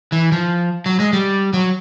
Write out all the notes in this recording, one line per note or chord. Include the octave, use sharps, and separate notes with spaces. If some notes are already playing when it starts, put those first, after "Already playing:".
E3
F3
F#3
G#3
G3
F#3